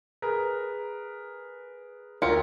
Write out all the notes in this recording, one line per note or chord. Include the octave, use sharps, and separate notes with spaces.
G#4 A#4 B4
D2 F4 A#4 G5 C#7